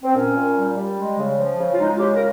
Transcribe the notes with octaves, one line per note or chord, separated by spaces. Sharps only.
C4
A#2 C#4
A#2
G3
G3
G#3
C#3
F3
C#3
F4
G#3 D#4
F4
C#3 G4
A#4